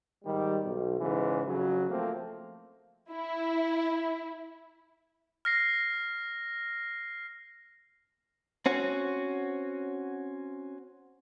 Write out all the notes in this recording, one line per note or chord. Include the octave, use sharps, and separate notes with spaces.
G#2 D#3 G3
B1
G#2 C#3 E3
F2 C#3 F#3
F3 A3 A#3 C4
E4
F6 A#6 C7
C4 C#4 F#4